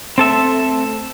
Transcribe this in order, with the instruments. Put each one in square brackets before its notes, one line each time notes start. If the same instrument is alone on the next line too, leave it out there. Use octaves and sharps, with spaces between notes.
[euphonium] A3 [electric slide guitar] C4 A4 E5